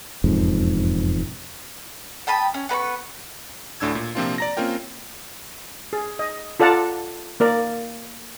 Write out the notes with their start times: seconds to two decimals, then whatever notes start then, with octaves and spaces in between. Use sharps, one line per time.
0.24 E1 F2 G#2
2.27 G5 A5 B5 D#6
2.54 C#4
2.69 B3 B4 A#5 C#6
3.80 D2 A2 D4 E6 G#6
3.95 A#2
4.15 C3 F3 A#3 C4 D4 F4
4.38 D5 A#5 A#6
4.57 A#3 C4 C#4 F4 A#4 G5
5.93 G#4
6.19 D#5
6.60 F4 A4 D5 F#5 A5 A#5
7.40 A#3 A#4 D5